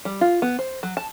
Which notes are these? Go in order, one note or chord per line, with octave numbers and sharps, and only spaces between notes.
G3
F4
B3
C5
F#3
A5